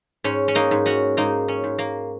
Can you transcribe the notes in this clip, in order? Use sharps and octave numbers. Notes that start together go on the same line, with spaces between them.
G#2 C#4
C#4
A#3 D#4
G#2
C#4 F#4
G#2 A#3 D#4
C#4
G#2
A#3